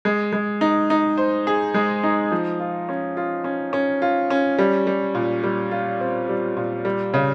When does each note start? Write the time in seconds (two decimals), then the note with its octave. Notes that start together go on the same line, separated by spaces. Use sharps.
0.05 G#3
0.33 G#3
0.61 D#4
0.90 D#4
1.18 C5
1.47 G#4
1.74 G#3
2.03 D#4
2.32 F3
2.60 F4
2.89 C#4
3.17 F4
3.44 C#4
3.73 C#4
4.02 F4
4.30 C#4
4.58 G3
4.87 G3
5.15 A#2
5.43 G3
5.71 F4
6.00 C4
6.29 G3
6.57 A#2
6.85 G3
7.14 C#3